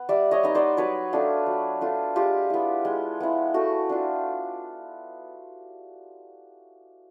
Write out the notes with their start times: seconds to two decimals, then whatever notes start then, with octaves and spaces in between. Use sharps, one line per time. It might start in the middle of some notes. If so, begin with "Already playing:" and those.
Already playing: B3
0.09 G3 D5 E5
0.31 C#5 D#5
0.43 B3 D#4
0.55 C5 D5
0.77 F#3 B4 C#5
1.13 A3 D4 F4
1.46 F#3
1.81 A3 D4 F4
2.15 G#3 F4 G4
2.50 B3 E4
2.85 G#3
3.20 B3 E4
3.54 A3 F#4
3.89 D4 F4